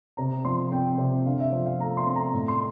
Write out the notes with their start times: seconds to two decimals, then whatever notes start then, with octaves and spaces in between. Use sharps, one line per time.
0.17 C3 A#5
0.45 F3 C6
0.72 C4 G5
0.98 C3
1.25 D3 F5
1.40 E5
1.52 F3
1.66 F5
1.79 A3 A#5
1.97 C6
2.06 C4
2.15 A#5
2.34 A2
2.48 C6